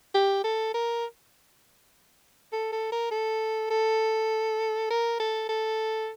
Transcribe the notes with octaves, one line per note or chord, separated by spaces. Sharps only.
G4
A4
A#4
A4
A4
A#4
A4
A4
A#4
A4
A4